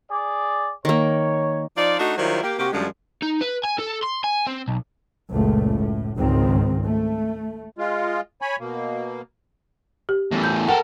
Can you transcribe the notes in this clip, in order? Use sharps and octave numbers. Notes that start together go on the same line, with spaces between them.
G#4 D5
D#3 A#3 C#5
F3 D#4 F4 D5
A3 D4 D#4 F#4
D#3 F#3 G3 E4 F4 C5
A#3 G4
C3 A#3 F#4 G4
F#2 D3 D#3 F3 G3 G#3
D#4
B4
G#5
A4
C6
G#5
C4
B1
F#1 C#2 A#2 A3
A2
G#1 C#2 G#2 D#3 C4
A3
G#3 F4
C#5 G#5 B5
B2 A#3
G4
E2 A2
G6
A4 A#4 F#5 G5